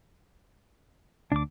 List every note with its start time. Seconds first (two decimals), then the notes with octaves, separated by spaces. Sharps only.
1.32 D2 D4 D6